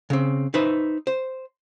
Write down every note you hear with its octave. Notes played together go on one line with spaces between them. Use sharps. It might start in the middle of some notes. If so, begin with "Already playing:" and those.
C#3 C4
D#4 B4 C5 E5
C5